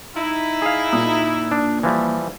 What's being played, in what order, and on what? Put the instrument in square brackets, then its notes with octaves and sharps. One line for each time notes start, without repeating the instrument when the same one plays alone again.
[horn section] D#4 E4
[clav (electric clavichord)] G#4 F5
[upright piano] A#2 D#6
[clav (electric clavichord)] D4
E3 F3 G3